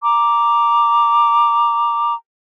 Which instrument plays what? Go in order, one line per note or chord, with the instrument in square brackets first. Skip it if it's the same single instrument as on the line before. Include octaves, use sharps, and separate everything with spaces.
[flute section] A#5 D6